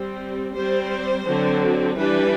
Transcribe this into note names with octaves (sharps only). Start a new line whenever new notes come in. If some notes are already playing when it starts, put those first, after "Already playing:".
Already playing: G3 C4
G3 C4 C5
D3 F#3 C4
E3 G3 D4 B4